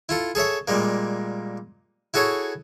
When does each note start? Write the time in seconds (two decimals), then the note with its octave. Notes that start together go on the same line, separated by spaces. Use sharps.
0.09 E4 F4 A4
0.35 G#4 A4 C#5 E5
0.68 A#2 G3 G#3 A#3
2.14 E4 F#4 G#4 A4 C#5